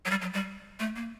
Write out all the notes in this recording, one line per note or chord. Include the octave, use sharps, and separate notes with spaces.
F#3
G3
F#3
G3
A3
A#3